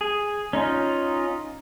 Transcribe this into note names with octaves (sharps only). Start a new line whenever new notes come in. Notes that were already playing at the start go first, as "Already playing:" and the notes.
G#4
C#4 D#4 F4